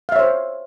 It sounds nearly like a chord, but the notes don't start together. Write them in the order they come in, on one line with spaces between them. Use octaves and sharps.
F5 E5 C#5 C5